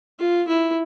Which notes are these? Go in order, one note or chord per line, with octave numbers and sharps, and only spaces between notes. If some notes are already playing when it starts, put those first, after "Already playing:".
F4
E4